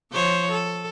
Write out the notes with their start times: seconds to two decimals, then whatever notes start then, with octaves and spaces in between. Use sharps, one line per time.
0.12 F3 C5 C#5
0.52 A4